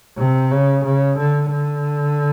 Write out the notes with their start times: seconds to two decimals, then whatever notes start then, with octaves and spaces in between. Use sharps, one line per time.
0.17 C3
0.51 C#3
0.84 C#3
1.17 D3
1.52 D3